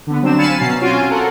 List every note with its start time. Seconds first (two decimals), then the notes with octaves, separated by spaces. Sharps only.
0.07 D3 B3
0.22 F#3 C4 D4 E7
0.37 F5 G#5 B5 A6 C#7 E7
0.59 B2 F#3 C#4 A6 C7
0.81 C4 C#4 F4 F#4 G#5 D7
1.09 A4 A#4 F#5 A5